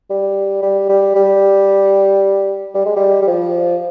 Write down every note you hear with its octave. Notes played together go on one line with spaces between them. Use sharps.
G3
G3
G3
G3
G3
G#3
G3
G3
F3